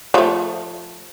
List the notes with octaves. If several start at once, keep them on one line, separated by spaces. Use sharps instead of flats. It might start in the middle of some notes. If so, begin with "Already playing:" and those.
F3 A3